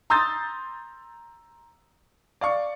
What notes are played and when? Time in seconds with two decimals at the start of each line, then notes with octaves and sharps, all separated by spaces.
0.10 A#5 C6 D#6 E6 G6 A6
2.41 D5 F5 C#6